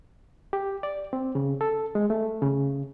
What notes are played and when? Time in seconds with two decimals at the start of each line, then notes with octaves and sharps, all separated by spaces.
0.53 G4
0.83 D5
1.13 C4
1.35 C#3
1.61 A4
1.95 G#3
2.10 A3
2.42 C#3